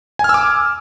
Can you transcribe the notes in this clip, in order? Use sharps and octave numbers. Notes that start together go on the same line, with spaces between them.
G#5 D6 E6 F6